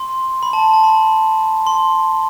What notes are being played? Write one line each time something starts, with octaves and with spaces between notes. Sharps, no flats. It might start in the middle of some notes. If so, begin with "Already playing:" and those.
Already playing: C6
B5
A5
A5
A5
B5
C6